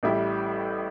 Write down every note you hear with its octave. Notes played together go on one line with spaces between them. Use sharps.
A1 A2 G3 E4 G4